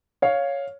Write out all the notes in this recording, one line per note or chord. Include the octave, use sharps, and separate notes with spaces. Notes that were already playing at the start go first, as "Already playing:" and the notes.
C#5 F5